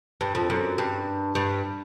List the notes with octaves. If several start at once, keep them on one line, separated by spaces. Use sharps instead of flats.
G2
F2
F#2
G2
G2